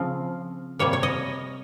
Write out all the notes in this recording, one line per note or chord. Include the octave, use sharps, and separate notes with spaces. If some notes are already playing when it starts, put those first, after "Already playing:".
Already playing: C#3 F3 C4 F4
C3 G3 A#3 C#5
C#5
D#5